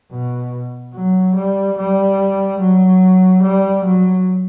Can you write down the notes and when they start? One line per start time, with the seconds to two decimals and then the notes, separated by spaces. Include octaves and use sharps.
0.11 B2
0.94 F#3
1.35 G3
1.77 G3
2.60 F#3
3.43 G3
3.85 F#3